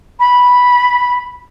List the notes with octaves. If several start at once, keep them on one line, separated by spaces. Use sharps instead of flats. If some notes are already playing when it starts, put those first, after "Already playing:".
B5